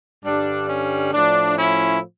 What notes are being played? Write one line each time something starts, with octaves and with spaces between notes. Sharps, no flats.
G2 D3 G3 D4
C#4
A2 F3 D4
C#4 E4